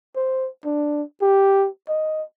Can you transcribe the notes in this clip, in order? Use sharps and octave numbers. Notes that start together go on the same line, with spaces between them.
C5
D4
G4
D#5